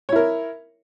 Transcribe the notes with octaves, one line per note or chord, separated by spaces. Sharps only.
E4 A#4 C#5